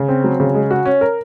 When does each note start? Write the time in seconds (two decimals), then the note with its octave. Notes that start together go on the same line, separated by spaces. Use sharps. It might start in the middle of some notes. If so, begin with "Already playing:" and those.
Already playing: C#3
0.09 C4
0.24 F#3
0.40 C#3
0.54 G#3
0.71 F#4
0.86 C#4
1.01 A#4